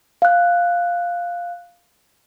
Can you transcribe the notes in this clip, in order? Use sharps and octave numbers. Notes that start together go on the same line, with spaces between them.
F5 F#6